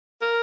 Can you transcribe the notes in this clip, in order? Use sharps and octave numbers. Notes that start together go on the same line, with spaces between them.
A#4